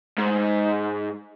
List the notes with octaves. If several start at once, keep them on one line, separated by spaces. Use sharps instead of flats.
G#2